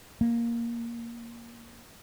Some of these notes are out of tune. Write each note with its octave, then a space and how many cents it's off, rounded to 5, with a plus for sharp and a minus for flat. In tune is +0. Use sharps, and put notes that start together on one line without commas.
A#3 +5